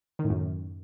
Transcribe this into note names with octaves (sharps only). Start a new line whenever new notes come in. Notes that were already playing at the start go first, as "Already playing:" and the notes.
D#3
A2
F#2